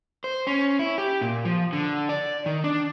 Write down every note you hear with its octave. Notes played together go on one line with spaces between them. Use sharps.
C5
C#4
E4
G4
A#2
F3
D3
D5
D#3
D4